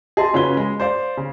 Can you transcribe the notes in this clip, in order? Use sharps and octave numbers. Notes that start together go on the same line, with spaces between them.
G#4 D#5 A5 C6
C#3 C#4 F4 F#4 B4 G7
G#3
C5 D5 F5
C#3